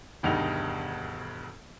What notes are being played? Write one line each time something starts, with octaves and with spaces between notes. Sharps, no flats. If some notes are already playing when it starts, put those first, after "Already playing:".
E1 D2 G2 D#3 D#4 F7